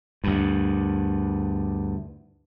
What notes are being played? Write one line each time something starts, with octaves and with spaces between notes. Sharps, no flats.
D2 G2